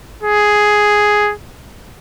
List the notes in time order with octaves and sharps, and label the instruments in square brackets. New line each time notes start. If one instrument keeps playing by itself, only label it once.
[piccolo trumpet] G#4